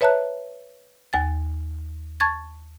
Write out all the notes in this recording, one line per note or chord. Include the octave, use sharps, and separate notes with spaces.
B4 C#5 E5 A5 A#5 F#6
D#2 G#5 A6
A5 C#6 G#6 A6